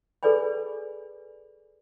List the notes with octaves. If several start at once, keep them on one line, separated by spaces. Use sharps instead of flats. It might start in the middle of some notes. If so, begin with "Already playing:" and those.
G#4 A4 B4 D5 G#5 B5